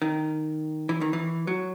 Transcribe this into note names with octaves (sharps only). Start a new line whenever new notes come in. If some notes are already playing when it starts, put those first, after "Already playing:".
D#3
E3
D#3
E3
F#3